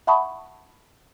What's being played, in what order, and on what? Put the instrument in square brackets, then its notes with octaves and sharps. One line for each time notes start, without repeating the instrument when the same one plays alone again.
[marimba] E5 F#5 A5 B5 C#6 D#6